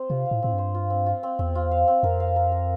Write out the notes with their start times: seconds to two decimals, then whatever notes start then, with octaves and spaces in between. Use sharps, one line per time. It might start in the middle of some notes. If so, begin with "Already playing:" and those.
Already playing: C4 C5
0.09 C3 F4
0.26 F5
0.31 A2
0.43 A2 C4
0.53 G2
0.58 C5
0.74 F4
0.90 C4
1.06 F4
1.23 C4
1.39 E2 C4
1.55 F4
1.71 F5
1.87 C4
2.03 F2 A#4
2.20 F5
2.36 A#4
2.52 A#4